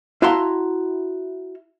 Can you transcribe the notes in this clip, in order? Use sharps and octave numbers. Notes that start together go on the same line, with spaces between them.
E4 F#4 F5 A5 A#5 C6